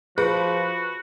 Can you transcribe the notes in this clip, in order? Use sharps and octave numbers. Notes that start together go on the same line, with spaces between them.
F3 F#4 G#4 B4